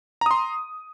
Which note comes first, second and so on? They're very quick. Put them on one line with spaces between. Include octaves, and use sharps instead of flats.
A#5 D#6 C6